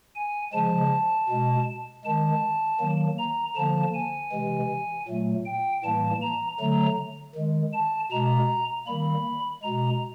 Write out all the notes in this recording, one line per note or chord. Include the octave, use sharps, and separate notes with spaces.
G#5
C#3 F3 G#3 A5
B2 G#3
D#3 G#3 A5
D#3 F#3 A#3
A#5
D3 F3 A#3 A5
G#5
C3 E3 G#3
A#2 F#3 A3
G5
A2 E3 G3 A#3 A5
A#5
D3 F#3 A3 A#5
D#3 G#3
A5
B2 G#3 A#5
D#3 G3 A#3 B5
B2 G#3 A#5